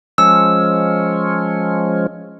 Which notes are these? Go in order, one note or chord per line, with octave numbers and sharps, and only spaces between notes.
F3 G#3 C#4 E6